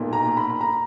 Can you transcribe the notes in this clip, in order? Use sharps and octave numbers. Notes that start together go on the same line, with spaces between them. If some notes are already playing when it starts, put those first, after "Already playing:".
Already playing: B1 A#2 A#3
A#5
B5
A#5